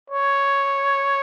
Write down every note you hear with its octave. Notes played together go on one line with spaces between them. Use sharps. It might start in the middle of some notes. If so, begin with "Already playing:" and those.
C#5